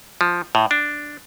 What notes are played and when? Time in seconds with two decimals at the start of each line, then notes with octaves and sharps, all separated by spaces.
0.21 F3
0.55 A2
0.71 D4